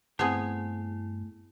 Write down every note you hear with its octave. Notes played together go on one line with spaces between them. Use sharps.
G2 A3 B3 C4 E4 G#4 G#5